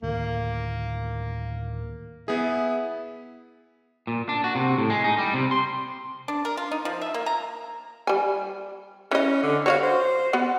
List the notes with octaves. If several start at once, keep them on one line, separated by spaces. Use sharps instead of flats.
D2 A2 D#3 A#3
B3 E4 G#4
A#2
D4
F#4
C3
A2
G#3
D#4
G3
C3
C6
D4
A#4
F4
D#4
F3
E5
A#3
A#5
G3 G#5
E3 C#4 D#5
D3
F#4 C#5 D5 F5
C5
B3 F#4